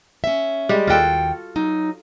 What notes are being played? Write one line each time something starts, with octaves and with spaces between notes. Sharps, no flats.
C#4 E5
G3 G#3 G4
D#2 F4 F#4 A4 G5
F#3 D#4